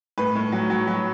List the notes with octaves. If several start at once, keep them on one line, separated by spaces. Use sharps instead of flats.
A2 B4
A2
F#3
F#3
F#3